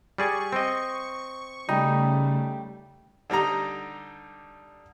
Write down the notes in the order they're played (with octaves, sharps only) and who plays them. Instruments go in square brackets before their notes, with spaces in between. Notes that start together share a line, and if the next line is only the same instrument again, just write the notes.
[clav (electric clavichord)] G3 G#4 D5 [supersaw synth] C#6
[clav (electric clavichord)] C4 D#5
[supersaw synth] C#3 A3 [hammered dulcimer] G3 [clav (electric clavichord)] D#4
[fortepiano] D3 G3 D#4 A#5